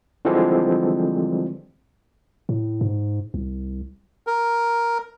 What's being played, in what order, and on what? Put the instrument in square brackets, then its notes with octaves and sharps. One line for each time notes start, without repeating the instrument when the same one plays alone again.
[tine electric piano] D3 E3 F3 G3 G#3 C4
[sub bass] A2
G#2
C2
[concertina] A#4